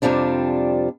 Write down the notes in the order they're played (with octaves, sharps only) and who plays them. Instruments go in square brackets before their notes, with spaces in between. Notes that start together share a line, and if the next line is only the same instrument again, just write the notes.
[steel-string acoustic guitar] F2 C3 F3 G3 D4